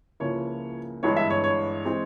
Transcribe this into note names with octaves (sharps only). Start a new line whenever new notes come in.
C#2 C#3 F3 A#3 E4 C#5
G1 G2 E3 G#3 C#5
E5
C#5
C#5
E3 G#3 C4